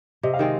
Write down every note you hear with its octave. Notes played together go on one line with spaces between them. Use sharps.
C3 D#5
F5
D#3 G#3 C4 D#5